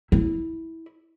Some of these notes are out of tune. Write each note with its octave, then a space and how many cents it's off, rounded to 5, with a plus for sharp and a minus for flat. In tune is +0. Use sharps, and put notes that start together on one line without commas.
E4 -15